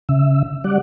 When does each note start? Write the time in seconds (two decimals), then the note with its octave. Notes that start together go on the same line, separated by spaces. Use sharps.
0.09 C#3 E5
0.64 G3 D5 F#5